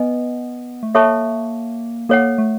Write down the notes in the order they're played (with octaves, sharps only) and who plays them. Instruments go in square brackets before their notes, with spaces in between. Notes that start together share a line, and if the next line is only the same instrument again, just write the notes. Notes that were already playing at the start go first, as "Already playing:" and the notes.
Already playing: [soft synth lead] B3 [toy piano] B4 D#5 G#5
[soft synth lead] A3
[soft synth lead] A#3 [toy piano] A4 C#5 E5 A5 C#6
[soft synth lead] A#3 [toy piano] A4 C#5 F#5
[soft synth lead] A3